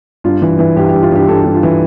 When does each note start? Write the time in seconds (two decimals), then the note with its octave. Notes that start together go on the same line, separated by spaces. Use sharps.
0.24 G2 F4
0.42 E3
0.59 E3
0.76 G2 G4
0.89 G4
0.94 G2
1.02 F4
1.12 G2 G4
1.28 G2 A4
1.42 G4
1.46 G2
1.54 F4
1.63 E3